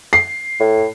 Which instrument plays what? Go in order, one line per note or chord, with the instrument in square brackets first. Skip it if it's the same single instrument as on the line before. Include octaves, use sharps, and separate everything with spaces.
[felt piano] C7
[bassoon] A2